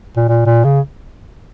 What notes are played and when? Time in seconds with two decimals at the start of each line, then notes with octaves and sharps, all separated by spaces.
0.16 A#2
0.28 A#2
0.46 A#2
0.64 C#3